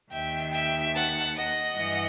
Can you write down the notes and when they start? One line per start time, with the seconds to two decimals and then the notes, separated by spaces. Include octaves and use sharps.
0.11 D#2 D#3 E5 G5
0.53 E5 G5
0.94 F#5 A5
1.36 D#5 F#5
1.77 G2 E3